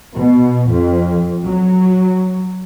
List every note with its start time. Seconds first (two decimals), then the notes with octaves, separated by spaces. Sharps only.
0.15 B2
0.69 F2
1.47 F#3